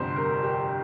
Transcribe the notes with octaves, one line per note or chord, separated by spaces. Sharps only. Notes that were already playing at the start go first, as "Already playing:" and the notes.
Already playing: G1 F2 C3 G3 C5
A#4
G4